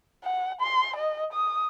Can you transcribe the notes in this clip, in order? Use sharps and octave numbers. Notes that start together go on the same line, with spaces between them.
F#5
C6
D#5
D#6